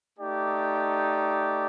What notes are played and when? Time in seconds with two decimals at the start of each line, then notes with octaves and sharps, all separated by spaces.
0.19 A3 D#4 G4 D5